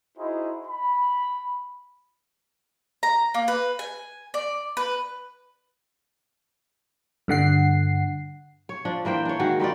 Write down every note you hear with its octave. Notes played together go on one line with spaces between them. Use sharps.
D#4 E4 F#4 G#4 C5 D#5
B5
A#5
A#3
B4
G#5
D5
B4
G2 D3 F#5 C7
C#5
F3 D4
E3 A#3 C5 G5
D4 C#5
D#3 G#3 F#4
G3 D#4 F4 D5